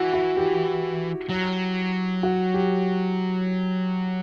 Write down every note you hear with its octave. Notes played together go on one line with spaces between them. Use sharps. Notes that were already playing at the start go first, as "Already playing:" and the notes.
Already playing: E3 E4 F#4
F#4
G4
F#3
F#4
G4